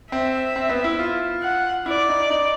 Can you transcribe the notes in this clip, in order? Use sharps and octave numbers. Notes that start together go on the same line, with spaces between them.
C4 E5
C4
B3
E4
F4
F#5
E4 D5
D#4
D#4